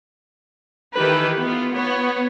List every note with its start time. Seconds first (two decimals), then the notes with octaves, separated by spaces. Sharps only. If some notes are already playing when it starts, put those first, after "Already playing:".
0.94 D#3 E3 G4 A4 B4
1.42 B3 F4
1.74 B3 C#5